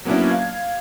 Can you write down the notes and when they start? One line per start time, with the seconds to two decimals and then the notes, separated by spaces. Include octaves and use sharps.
0.05 F#3 A#3 B3 C#4 D4 E4
0.28 F5 G#6